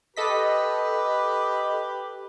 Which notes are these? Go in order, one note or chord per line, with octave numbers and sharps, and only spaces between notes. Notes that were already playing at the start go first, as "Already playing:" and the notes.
G4 A4 B4 D#5 B6